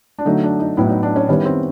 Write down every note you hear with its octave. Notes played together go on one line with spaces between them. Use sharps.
D4
D3 F#3 A3 D#4
D4
D#4
A2 F#3 B3 E4
D#4
D4
C#4
D#3 G3 B3 C#4 E4
C4